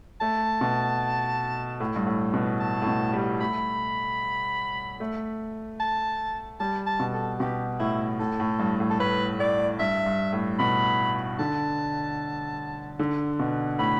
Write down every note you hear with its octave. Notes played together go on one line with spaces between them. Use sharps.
A3 A5
B2
A2
G2
A2
B2
A5
A2
B2
G3
A3 B5
A3
A5
G3 A5
A5
B2
A4
B2 G4
A2 E4
A2 A4
A2
G2
A2
A4
A2 B4
A2 D5
G2 E5
G2
A2
B2 B5
D3 A5
D3
B2
A2 B5